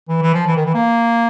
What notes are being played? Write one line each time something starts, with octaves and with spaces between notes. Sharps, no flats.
E3
E3
F3
E3
D#3
E3
A#3